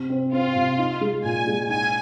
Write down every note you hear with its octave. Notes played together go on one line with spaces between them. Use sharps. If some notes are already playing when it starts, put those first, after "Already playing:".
Already playing: C3
C4
C4 F4
C3
D#4
G#3
A#2 G#5
G#3
D#4 G#5